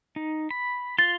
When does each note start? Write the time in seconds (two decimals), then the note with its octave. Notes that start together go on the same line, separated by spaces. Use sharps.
0.16 D#4
0.51 B5
0.98 F4 C6 A6